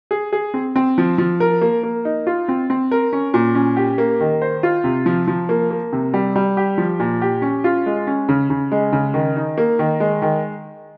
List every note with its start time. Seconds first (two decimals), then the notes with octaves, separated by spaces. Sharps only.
0.11 G#4
0.33 G#4
0.54 C4
0.76 C4
0.98 F3
1.18 F3
1.40 A#4
1.61 A#3
1.83 A#3
2.05 D#4
2.27 F4
2.48 C4
2.70 C4
2.91 A#4
3.13 C#4
3.34 A#2
3.55 C#4
3.76 G4
3.98 A#3
4.20 D#3
4.42 C5
4.63 F4
4.84 C3
5.06 F3
5.27 F3
5.49 A#3
5.71 A#3
5.93 C3
6.14 G3
6.36 G3
6.57 G4
6.78 F3
7.00 A#2
7.21 G4
7.42 C#4
7.64 F4
7.86 G#3
8.07 C#4
8.29 C#3
8.50 C#3
8.72 G#3
8.92 C#3
9.14 D#3
9.36 D#4
9.58 A#3
9.79 D#3
10.00 G#3
10.22 D#3